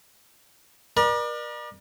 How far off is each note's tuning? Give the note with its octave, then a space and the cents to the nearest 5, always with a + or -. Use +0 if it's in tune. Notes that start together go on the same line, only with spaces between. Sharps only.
A#4 +45 D5 +35 A#5 +45